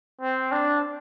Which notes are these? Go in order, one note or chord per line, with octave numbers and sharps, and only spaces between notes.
C4
D4